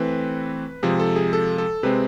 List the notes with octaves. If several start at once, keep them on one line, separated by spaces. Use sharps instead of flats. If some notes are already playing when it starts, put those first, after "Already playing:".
Already playing: E3 A3 C4 B4
C3 F3 G#3 G#4
A4
G#4
A4
A4
C3 G#3 C4 B4